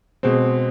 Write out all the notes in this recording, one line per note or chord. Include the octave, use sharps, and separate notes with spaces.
B2 G#3 C4